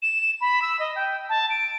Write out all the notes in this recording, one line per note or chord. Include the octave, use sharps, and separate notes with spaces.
E7
B5
E6
D#5
G5
A5
D7